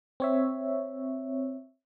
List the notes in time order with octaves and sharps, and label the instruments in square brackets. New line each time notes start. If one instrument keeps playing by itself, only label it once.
[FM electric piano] C4 C#5 E5